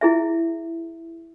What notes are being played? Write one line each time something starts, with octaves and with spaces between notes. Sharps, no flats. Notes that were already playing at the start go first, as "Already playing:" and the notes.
E4 G#4 E5